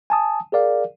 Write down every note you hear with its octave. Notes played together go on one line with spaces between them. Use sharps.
G#5 A5 D#6
G#4 A#4 D5 F5